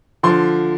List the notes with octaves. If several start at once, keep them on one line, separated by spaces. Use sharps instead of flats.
D3 F3 C6